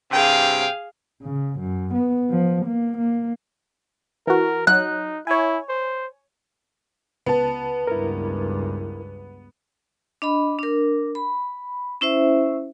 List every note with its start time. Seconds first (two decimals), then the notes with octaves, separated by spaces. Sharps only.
0.12 G2 C3 G#4 F5 G5
1.23 C#3
1.60 F#2
1.94 B3
2.30 F3
2.66 A#3
2.98 A#3
4.27 E3 F#4 A#4
4.67 F#3 D#4 F#6
5.27 E4 C#5 G#5
5.69 C5
7.26 C#2 B3 A5
7.87 C#2 G2 E4 A#4
10.22 D4 D#5 B5
10.59 D4 A#4
11.15 B5
12.01 C#4 E4 C5 E5